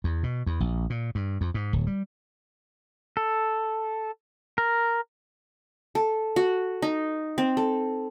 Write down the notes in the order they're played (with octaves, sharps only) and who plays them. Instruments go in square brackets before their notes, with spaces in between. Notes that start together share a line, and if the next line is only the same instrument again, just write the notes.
[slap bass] E2
B2
E2
A#1
A#2
G2
F2
G#2
D1
G3
[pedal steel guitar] A4
A#4
[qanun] A4
F#4
D#4
C4
A4